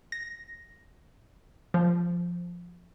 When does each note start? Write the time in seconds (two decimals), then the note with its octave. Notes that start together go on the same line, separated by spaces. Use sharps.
0.12 A#6
1.74 F3